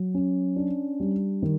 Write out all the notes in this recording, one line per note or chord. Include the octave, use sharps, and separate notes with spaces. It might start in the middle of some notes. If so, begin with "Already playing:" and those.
Already playing: F#3
C#4
D4
G3
D#3